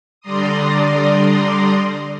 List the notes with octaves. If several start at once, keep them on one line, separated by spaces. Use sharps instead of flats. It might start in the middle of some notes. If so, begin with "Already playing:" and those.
D3 G3 D5 A#5 C6 D#6